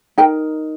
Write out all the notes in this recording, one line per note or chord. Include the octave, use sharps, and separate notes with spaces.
D#4 A#4 G5